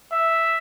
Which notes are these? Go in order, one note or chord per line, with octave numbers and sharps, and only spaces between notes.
E5